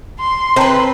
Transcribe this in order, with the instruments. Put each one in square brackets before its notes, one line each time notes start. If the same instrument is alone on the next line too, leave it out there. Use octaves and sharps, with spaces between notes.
[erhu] C6
[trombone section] C4 [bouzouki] B4 C5 [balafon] G5 A5 A#5